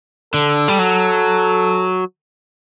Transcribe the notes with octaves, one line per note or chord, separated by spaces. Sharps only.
D3 A4
G3
F#3